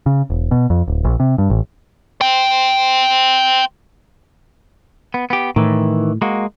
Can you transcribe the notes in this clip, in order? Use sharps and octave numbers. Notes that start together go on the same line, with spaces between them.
C#3
E1
B2
F2
D1
A#1
C3
G2
A1
C5 G5
B3
B3 G4
A2 D#3 E3
G#3 A#3 F#4